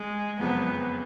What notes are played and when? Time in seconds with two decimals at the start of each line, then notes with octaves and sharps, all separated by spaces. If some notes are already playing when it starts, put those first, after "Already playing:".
Already playing: G#3
0.40 F#1 F2 C#3 F#3 B3